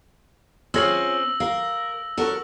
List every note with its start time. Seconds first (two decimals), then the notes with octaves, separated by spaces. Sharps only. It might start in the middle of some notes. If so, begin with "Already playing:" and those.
0.74 C4 C#4 F4 G#4 C#5 E6 A#6 F#7
1.40 A#4 F5
2.17 C#4 F#4 A4 A#4